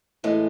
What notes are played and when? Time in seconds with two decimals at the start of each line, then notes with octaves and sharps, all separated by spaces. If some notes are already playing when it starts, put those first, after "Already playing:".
0.24 A2 E3 G#3